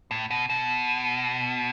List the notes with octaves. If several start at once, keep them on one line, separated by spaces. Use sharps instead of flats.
A2
B2
B2